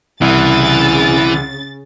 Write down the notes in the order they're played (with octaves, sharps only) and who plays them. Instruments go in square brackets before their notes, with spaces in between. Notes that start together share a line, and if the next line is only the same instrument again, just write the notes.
[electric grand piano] C2 [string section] C#3 A6 [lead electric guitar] E3